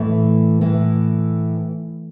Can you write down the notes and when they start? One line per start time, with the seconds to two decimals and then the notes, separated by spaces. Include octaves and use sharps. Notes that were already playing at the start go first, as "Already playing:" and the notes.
Already playing: A2 E3 A3
0.61 A2 E3